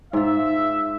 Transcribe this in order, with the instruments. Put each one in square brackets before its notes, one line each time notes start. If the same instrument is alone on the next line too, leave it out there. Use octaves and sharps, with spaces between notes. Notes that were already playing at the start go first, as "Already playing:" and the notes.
[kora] G#2 F4 [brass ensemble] E5